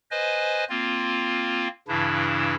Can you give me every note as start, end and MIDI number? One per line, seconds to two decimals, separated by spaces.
0.11 0.64 71
0.11 0.64 72
0.11 0.64 75
0.11 0.64 80
0.70 1.68 58
0.70 1.68 60
0.70 1.68 65
1.88 2.55 43
1.88 2.55 49
1.88 2.55 52
1.88 2.55 62
1.88 2.55 64